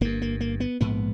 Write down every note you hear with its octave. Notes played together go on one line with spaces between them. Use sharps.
G1 G2 A#3
A#3
A#3
B3
A#1 G#2 B3